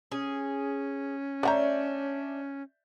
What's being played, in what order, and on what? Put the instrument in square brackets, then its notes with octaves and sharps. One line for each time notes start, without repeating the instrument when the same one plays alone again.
[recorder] C#4 [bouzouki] G#4
[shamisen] A3 F#5 A#5 [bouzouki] D4 C#5 [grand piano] D5 E5 G6